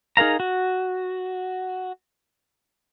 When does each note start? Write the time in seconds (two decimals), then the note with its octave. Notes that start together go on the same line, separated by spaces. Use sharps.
0.17 D#4 G#4 A#4 F5 A#5
0.40 F#4